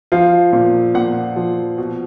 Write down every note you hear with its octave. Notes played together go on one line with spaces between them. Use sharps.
F3 F5
A#2
A#2 F#5
F3
B2